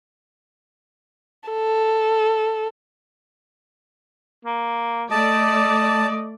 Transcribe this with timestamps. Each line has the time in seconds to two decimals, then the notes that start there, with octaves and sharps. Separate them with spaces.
1.49 A4
4.45 A#3
5.11 A3 D5 D#5 A5